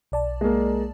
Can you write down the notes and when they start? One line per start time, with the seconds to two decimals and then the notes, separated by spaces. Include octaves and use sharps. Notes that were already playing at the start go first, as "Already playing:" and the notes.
0.12 B1 D5 A5
0.41 G#3 A#3